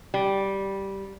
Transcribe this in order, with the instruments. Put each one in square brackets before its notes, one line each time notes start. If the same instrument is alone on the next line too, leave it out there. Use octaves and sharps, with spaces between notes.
[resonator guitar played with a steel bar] G3